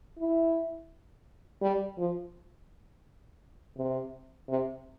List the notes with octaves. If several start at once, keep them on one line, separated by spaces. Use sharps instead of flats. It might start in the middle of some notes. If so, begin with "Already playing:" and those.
E4
G3
F3
C3
C3